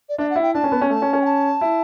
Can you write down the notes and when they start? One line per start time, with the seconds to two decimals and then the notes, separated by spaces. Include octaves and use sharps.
0.09 D5
0.18 D4 E5
0.30 F#5
0.36 E4
0.42 G5
0.54 D4 A5
0.64 C#4
0.72 B3
0.81 C#4
0.90 A3 A5
1.02 C#4
1.13 C#4
1.22 G5
1.26 A5
1.61 E4